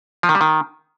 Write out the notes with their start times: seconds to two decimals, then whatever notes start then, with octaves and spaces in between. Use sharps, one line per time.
0.23 F3
0.29 D#3
0.35 G3
0.41 D#3